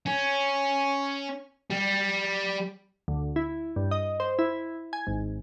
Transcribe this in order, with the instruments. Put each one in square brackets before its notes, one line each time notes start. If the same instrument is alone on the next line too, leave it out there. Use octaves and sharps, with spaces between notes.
[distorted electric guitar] C#4
G3
[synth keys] D2
E4
G2
D#5
C5
E4
G#5
G#1